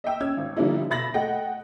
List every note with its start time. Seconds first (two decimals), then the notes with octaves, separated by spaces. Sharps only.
0.04 D#5 E5 G5 E6
0.21 C#4 E6 G#6
0.37 G#1
0.56 D3 F3 G3 A#3 D#4 E4
0.90 B2 E5 B5 A6 A#6 F#7
1.14 A3 D#5 F#5 G5